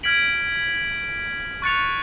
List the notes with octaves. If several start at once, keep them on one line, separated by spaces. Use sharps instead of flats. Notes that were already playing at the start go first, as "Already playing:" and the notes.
F6 G#6 B6 D7 F#7
C#6 F#6 A6 C#7 F7